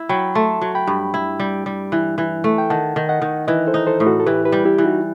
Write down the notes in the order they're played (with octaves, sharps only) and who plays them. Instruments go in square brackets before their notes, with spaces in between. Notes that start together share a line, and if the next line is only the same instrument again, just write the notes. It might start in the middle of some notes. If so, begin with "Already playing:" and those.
Already playing: [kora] E4
[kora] F#3 [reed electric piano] G5 B5
[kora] A3 [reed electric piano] A5 C6
[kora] F#3
[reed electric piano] G5 B5
[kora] G2
E4
G3
G3
E3
E3
A3
[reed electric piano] G5
[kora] D#3 [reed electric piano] F#5 A5
[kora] D#3
[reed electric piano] D#5 F#5
[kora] D#3
[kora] E3 [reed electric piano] B4 D#5
[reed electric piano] A4 C5
[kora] D#4
[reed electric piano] A4 C5
[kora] A2
[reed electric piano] F#4 A4
A4
[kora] E3 [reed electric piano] G4 B4
[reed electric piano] G4 B4
[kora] G3
[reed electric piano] E4 G4
[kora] E3
[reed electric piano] D#4 F#4